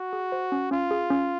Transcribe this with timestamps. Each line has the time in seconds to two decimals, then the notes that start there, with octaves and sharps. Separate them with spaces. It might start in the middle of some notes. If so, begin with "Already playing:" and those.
Already playing: F#4
0.13 G#4
0.32 C5
0.52 C#4
0.71 C#4 F4
0.91 G#4
1.10 C#4